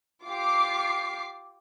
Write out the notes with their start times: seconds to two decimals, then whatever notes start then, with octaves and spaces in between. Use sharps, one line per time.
0.24 F4 G4 D6 C7